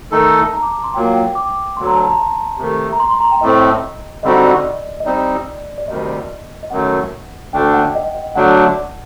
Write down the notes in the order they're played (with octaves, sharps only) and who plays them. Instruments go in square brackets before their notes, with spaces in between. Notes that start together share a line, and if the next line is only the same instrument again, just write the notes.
[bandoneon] D#3 A3 D#4 A4 [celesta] A5
[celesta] A#5
D6
C6
[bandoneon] A#2 F#3 A#3 [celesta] G5
[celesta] G5
D6
[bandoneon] D2 D3 F#3 [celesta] C6
[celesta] A#5
A5
A#5
[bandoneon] C3 D#3 A3
[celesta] A#5
C6
C6
A#5
G5
[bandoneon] A2 A3 C4 [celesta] D#5
[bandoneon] D3 G3 C4 D#4 F#4 [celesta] D#5
[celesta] D5
D#5
D#5
[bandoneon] G3 C4 D#4 [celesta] D5
[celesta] D5
[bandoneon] D2 C3 D#3 G3 [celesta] D#5
[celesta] D#5
[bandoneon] F#2 D#3 F#3 A3 [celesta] F#5
[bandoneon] D2 D3 A3 D4 [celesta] G5
[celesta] F#5
D#5
D#5
[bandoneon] D3 F#3 A3 D4 [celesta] F#5